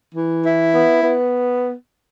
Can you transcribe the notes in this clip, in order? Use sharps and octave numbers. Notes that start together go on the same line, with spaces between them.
E3
E4
B3
B3